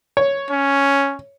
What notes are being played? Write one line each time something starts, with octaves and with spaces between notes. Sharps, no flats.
C#5
C#4